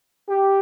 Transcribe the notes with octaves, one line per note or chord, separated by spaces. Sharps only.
G4